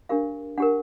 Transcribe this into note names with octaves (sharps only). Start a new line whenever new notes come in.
D4 G4 A#4 F5
D4 G4 A#4 F#5